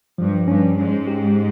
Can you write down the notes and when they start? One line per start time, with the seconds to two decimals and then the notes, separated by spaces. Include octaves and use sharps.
0.18 G2 F3
0.48 G2 C#4
0.78 G#2 C#4
1.07 G4